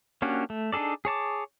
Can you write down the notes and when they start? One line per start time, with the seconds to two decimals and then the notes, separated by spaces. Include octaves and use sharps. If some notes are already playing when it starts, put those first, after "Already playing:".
0.22 A#3 C#4 D4 F#4 G4
0.50 A3
0.73 D4 D#4 G#4 A4 D5
1.05 G#4 C#5 A5 D6